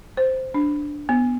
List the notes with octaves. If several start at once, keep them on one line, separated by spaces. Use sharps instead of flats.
C5
D4
B3